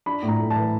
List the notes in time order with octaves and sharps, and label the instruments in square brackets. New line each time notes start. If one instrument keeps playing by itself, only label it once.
[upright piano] D4 B5
A2
A#5
A3
A5
E3